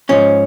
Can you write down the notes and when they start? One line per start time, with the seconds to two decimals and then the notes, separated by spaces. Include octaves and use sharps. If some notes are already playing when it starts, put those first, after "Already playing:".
0.09 G#2 F3 C#4